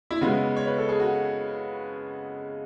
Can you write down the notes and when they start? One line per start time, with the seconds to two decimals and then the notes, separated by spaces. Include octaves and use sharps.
0.11 E4
0.21 C#3 G#3 B3 F#4
0.56 C#5
0.67 B4
0.78 A4
0.89 G#4
1.00 F#4